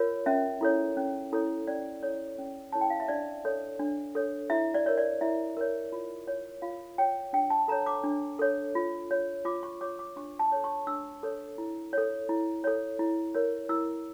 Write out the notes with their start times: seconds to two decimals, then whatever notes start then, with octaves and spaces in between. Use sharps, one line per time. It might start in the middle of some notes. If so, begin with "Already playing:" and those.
Already playing: F4 A#4 C#5
0.26 C#4 E5
0.61 E4 A4 C#5
0.97 C#4
1.33 E4 A4 C#5
1.67 C#4 D5
2.03 E4 A4 C#5
2.38 C#4
2.72 E4 A4 C#5 A5
2.81 G5
2.90 F5
3.00 E5
3.08 D4 D5
3.45 A4 C#5
3.79 D4
4.15 A4 C#5
4.50 E4 E5
4.74 D5
4.86 A#4 C#5
4.98 D5
5.21 E4 E5
5.57 A#4 C#5
5.92 F4
6.27 C#5
6.62 F4 F5
6.98 C#5 G5
7.33 D4 G5
7.50 A5
7.68 A4 A#5
7.72 C#5
7.86 D6
8.03 D4
8.39 A4 C#5
8.75 F4
9.11 C#5
9.45 F4 D6
9.63 C#6
9.81 C#5 D6
9.99 D6
10.16 D4 C#6
10.39 A5
10.52 A4 C#5
10.64 C#6
10.87 D4 E6
11.23 A4 C#5
11.58 E4
11.93 A4 C#5
12.29 E4
12.64 A4 C#5
12.99 E4
13.34 A#4 C#5
13.69 E4 E6